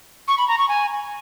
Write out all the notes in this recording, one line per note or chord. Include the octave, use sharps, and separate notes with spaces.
C#6
B5
A#5
C#6
G#5